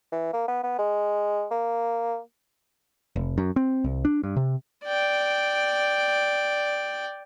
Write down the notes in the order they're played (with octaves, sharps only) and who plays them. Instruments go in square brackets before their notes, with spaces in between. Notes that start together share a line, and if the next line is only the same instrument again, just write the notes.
[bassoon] E3
A#3
B3
B3
G#3
A#3
[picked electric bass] F1
F#2
C4
C2
D4
G2
C3
[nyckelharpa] D5 G5